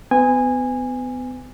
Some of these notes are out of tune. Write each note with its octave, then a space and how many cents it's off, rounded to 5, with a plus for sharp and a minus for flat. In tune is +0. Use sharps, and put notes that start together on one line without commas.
B3 +35 G#5 -20